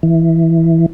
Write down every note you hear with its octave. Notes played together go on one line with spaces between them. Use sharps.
E3